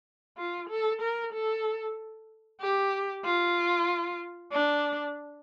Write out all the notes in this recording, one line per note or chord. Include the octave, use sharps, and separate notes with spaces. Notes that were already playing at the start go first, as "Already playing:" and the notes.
F4
A4
A#4
A4
G4
F4
D4